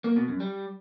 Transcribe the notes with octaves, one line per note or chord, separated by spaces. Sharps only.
A#3
B2
F#2
G3